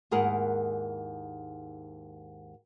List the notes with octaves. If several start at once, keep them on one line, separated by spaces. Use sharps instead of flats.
D#2 G#2 E4 G#4 A#4 F#5